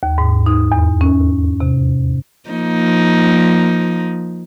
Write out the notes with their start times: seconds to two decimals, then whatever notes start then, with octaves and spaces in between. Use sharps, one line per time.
0.03 D#2
0.18 G#2
0.46 D#4
0.72 E2
1.01 C#4
1.60 C3
2.50 F3 A#3 D#4